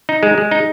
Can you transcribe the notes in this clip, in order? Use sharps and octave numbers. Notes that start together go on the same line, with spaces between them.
D#4
G#3
G#3
D#4